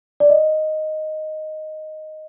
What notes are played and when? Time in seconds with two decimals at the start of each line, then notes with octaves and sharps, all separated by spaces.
0.20 D5
0.30 D#5